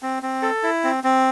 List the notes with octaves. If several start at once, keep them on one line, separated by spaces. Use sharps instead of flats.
C4
C4
A4
E4
C4
C4